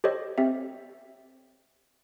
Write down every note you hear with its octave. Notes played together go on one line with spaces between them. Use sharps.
G4 A4 C5 C#5 D#5
C4 G4 E5